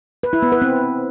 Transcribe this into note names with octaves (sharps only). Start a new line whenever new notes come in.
B4
E4
B3
B4
C4